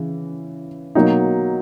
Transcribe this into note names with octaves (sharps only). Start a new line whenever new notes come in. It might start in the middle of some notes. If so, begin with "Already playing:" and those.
Already playing: C#3 E3
B2 F#3 A#3 D#4